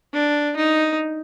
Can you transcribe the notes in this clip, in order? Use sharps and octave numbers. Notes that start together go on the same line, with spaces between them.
D4
D#4